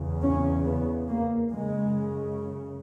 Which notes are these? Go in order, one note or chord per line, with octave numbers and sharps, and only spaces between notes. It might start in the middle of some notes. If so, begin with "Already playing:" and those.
Already playing: E2 C#3
C#4
B3
A#3
F#2 C#3 G#3